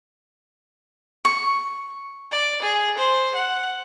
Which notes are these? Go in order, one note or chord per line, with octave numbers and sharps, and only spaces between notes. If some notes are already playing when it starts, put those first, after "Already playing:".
C#6
D5
G#4
C5
F#5